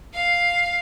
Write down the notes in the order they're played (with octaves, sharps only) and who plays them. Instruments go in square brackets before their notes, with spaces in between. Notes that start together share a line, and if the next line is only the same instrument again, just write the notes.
[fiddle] F5